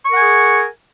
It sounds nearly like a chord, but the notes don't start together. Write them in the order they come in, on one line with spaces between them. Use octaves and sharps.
C#6 A#4 F#5 G#5 G#4